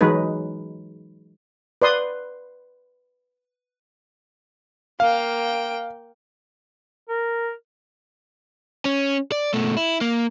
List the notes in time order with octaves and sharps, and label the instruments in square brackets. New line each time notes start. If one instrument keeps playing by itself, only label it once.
[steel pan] E3 F#3 G#3 D#4 B4
B4 D5 C6 D#6
[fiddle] A#3 G5 [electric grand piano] F5
[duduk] A#4
[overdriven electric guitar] C#4
D5
B2 A3
E4
A#3